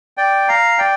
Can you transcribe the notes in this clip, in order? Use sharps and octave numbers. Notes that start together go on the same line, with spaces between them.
D5 G5
F5 A#5
D5 G5